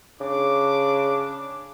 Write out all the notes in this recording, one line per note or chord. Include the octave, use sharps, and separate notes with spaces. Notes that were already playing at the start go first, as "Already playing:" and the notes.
C#3 D4 D6